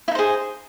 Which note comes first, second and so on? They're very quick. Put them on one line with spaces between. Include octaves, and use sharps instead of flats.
E4 D#4 C5 G#4